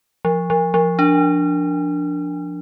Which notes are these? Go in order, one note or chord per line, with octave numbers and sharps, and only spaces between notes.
F3
F3
F3
D4